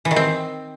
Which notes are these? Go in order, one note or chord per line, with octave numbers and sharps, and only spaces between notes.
E3
D#3
C4